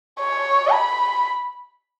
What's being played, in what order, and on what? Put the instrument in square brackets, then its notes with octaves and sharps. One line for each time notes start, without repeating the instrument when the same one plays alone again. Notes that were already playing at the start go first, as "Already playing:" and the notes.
[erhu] C#5
B5